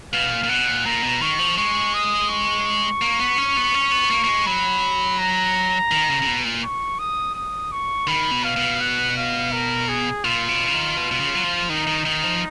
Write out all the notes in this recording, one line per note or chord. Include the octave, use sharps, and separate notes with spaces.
B2 F5
A#2
A#2
B2 F#5
A#2
A#2 A#5
B2
D#3 C#6
F3
G#3 C#6
D#6
C#6
A#3
B3
C#4
B3
C#4
B3
A#3
A#3
G#3
F#3 B5
A#5
D#3
C#3
C#3
B2
A#2
C#6
D#6
D#6
C#6
D#3 B5
B2
F5
B2
F#5
F5
A#4
G#4
A#2 F4
B2
C#3
D#3
B2
B2
C#3
F#3
F3
D#3 D#4
D#3
D#3 D#4
F3